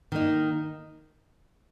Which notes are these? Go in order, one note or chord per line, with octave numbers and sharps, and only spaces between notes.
D#3 A#3 D#4